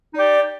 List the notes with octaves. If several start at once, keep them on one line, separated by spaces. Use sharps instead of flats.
D#4 G4 D5